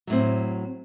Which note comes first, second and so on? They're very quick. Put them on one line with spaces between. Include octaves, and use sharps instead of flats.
F#3 A2 C4